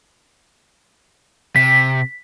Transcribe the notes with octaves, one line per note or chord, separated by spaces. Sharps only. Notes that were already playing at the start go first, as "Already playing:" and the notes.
C3 B6